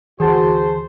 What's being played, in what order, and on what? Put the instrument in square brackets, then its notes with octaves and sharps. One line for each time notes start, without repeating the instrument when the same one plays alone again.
[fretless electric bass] D2 E3 [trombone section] F#4 [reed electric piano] G#4 A5 [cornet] C5